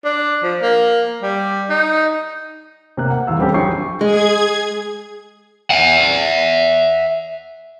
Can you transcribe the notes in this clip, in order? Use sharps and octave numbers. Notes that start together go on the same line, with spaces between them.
D4
F3
A#3
G3
D#4
C3 A#3 F#6
F#5
D#1 E2 F5 E6
G3 C4 C#4 G4 A4
A#1 F#2 G4 G5 C#6 C7
G#3 G#4 G#6
E5 F#5